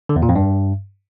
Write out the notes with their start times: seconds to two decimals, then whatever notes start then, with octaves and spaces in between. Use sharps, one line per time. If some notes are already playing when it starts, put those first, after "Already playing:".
0.09 D3
0.16 E2
0.22 A#2
0.29 F2
0.36 G2